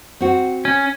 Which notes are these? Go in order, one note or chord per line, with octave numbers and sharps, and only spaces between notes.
C4 F#4
C#4